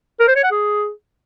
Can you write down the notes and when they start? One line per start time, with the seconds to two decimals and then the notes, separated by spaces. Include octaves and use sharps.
0.20 A#4
0.28 C5
0.35 C#5
0.43 F#5
0.51 G#4